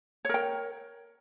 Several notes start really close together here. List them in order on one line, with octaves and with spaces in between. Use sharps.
C#5 A#4 G5